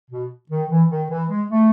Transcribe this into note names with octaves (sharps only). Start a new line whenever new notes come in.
B2
D#3
E3
D#3
E3
G#3
A3